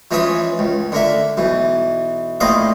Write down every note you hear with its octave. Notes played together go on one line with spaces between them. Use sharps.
E3 F3 G#3 C#4 G#4 E5
C#2
D3 A#3 E5
B1 E3
A#1 A2 C4 D#5 F5 D6